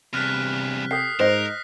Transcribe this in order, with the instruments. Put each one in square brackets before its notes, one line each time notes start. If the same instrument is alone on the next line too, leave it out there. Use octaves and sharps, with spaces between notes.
[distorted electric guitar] E2 G2 [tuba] C3 [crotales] F6 F#6 B6
[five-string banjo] G4 A4 [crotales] D#6 B6 C7
[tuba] G#2 [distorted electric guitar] A#4 [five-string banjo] C5 D#5 [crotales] F#6 A#6 C7